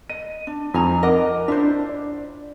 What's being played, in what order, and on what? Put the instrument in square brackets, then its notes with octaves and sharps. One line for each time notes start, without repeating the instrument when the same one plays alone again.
[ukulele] D#5 [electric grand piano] D#7
[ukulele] D4
[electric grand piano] F2 [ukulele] D#4 G#5 A#5
[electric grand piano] A#4 F#5 D6 [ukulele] D#5
[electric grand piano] D4 [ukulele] E4 F4 C5
[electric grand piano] D5